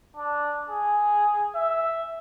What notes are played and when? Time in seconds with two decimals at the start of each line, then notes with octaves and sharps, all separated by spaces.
0.16 D4
0.69 G#4
1.55 E5